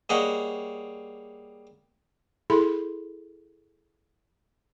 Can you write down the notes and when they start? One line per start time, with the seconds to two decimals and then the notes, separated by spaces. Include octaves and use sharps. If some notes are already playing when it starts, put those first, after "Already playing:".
0.09 G3 A#3 G#4 C#5 D#5 F#5
2.50 E4 G#4 A4 B5 C6